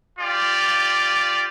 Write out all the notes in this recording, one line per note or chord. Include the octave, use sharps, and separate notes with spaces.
F4 G4 D5